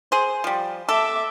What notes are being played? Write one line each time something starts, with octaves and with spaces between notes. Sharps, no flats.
G#4 C5
F3 G3
A4 E5 D6